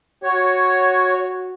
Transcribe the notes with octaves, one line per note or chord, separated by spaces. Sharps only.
F#4 C#5